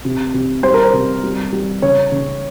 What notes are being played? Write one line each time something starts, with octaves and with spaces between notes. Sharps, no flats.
C3
C3
G3 C5
A#4
C5
C3
G3
G3
C#3 C#5
C#3